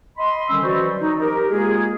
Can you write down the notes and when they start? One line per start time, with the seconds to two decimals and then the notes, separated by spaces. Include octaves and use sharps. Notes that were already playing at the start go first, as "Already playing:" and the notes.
0.17 D#5 B5 C6
0.50 D3 D#3 G3 C#4 E6
0.62 E3 F#3 F#4 C5 D5 C#6
1.00 D#4
1.20 G4 A#4
1.50 G#3 A#3 F4 G#4